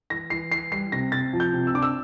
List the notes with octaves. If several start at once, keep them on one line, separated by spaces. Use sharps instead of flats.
E3 A#6
E3 C7
E3 C7
G3 C7
C3 A#6
C3 A6
F3
G6
C3
E6
D4 D6
E6